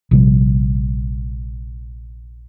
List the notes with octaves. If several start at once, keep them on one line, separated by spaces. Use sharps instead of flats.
A#1 C3 G3